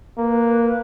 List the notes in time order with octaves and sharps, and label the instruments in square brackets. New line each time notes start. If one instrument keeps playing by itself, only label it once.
[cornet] A#3 [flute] B4